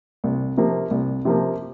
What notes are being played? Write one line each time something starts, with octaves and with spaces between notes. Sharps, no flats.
C2
C3 F3 A#3
C2
C3 F3 A#3